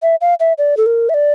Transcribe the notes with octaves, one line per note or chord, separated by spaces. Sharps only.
E5
F5
E5
D5
A4
A#4
E5
D5